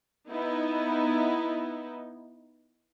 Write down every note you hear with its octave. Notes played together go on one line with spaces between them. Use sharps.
B3 D#4 E4